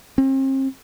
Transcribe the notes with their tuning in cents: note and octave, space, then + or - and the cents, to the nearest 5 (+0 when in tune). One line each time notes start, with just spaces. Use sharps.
C4 +40